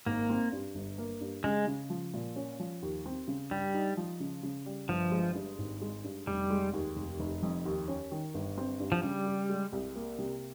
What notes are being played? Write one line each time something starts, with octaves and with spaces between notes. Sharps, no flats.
G#1 A#3
C4
G2
G1
A#3
G2
C#3 G#3
C#3
F3
A#2
C#4
F3
D#2
C4
C#3
G2 G3
D#4
F3
C#3
C#3
G3
G1 F3
G#3
G2
G#1
G#3
G2
F1 G3
G#3
D#2
F1
F1
F2
D#2
C#4
D#3
G1
C4
G2
F3
C#3 G3
G4
G#3
C2
A#3
C3